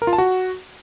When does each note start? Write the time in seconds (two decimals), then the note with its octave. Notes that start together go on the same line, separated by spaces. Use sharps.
0.02 A#4
0.07 F4
0.13 A5
0.18 F#4